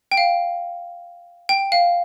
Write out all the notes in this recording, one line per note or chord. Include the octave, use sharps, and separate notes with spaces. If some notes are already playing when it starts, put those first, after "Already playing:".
G5
F5
G5
F5